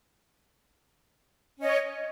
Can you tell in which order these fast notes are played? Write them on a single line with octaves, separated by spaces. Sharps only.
C#4 D#5 C#5